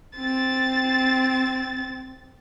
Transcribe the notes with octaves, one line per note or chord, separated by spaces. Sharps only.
C4 A6